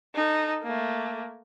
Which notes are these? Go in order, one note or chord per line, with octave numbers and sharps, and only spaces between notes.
D#4 A4
A3 A#3